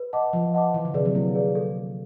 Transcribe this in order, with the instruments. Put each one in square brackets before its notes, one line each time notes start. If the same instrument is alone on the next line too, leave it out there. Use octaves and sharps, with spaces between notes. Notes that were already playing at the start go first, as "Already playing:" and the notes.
Already playing: [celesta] B4
D#5 F#5 A5 D6
[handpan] F3 [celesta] B4
[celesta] D#5 F#5 A5 D6
[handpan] E3 [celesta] E4
[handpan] D3
[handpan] C3 [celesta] G#4 B4 D5
[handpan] F#3
[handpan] A#3 [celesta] E4
[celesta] G#4 B4 D5
A4